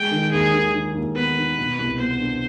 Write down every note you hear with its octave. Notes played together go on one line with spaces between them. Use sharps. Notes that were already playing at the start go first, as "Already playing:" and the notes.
Already playing: G#3 G5
D#3
D#2 G#4
D#3
D#3
D#2
B3 B4
D#3
B2
C2
B3 C5
D4